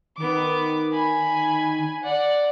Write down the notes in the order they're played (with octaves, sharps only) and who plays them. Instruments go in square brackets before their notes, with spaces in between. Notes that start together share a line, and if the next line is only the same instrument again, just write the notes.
[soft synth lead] D#3 [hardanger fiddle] B3 D6
[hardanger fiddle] G#5 B5
D5 F#5